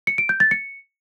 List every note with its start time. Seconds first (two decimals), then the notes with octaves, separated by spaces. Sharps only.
0.07 C#7
0.18 D7
0.29 G6
0.40 A6
0.51 C#7